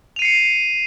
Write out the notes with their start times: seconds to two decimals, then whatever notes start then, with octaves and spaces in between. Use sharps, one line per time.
0.16 F7
0.19 D#7
0.22 C7
0.25 C#7